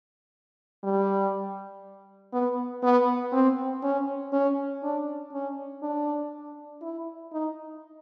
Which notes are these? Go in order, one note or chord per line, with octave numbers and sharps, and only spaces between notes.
G3
B3
B3
C4
C#4
C#4
D4
C#4
D4
E4
D#4